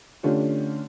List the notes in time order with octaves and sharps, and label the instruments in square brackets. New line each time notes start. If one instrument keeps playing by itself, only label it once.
[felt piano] D3 A3 C#4 D4 F4 G4